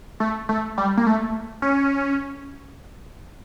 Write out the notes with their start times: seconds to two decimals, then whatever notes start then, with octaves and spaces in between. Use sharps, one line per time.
0.20 A3
0.49 A3
0.78 G3
0.97 A#3
1.07 A3
1.62 C#4